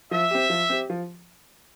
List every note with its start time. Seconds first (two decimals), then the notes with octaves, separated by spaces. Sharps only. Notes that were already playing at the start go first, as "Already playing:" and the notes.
0.11 F3 E5
0.31 C4 G4
0.50 F3
0.70 C4 G4
0.90 F3